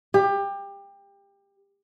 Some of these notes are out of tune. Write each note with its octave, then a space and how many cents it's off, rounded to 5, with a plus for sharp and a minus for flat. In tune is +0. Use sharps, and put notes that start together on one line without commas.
G4 +25